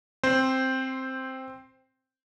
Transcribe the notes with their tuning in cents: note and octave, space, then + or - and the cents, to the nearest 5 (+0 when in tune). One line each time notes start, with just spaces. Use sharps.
C4 +5 C5 +0